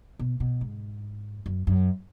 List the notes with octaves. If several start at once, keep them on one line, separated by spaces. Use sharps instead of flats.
B2
B2
G#2
F#2
F#2